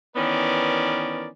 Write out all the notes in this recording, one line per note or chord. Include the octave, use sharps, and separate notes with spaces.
D#3 E3 B3 C#4 A#4 D5